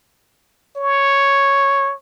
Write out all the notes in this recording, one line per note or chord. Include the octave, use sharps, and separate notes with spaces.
C#5